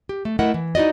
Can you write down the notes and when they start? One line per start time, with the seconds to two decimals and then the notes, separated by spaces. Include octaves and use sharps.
0.09 G4
0.25 A3
0.39 A3 E4 A#4 D#5 F#5
0.54 E3
0.75 D#4 E4 F#4 D5 D#5